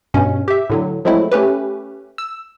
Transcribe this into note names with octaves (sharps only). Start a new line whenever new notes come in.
G2 B2 C#4
G4 E5
A2 D3 F#3
F3 F#3 G#3 A3 C4 E4
A3 C#4 G4 B4
E6